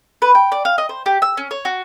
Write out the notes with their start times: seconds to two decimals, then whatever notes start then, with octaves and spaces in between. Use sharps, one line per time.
0.22 B4
0.35 G5
0.52 D5
0.65 F5
0.78 D#5
0.89 C5
1.06 G4
1.22 E6
1.37 C#4
1.51 C#5
1.65 F#4